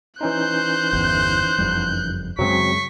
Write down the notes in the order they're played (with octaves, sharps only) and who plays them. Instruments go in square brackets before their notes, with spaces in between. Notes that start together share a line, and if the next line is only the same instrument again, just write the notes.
[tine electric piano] E3 C#4 D#4 [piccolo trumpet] C5 [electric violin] F#6 G6
[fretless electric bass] G1 E2
F#1 F2 G3
[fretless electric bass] F#2 C#3 G#3 [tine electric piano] F#3 C4 [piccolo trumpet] C#6 [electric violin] B6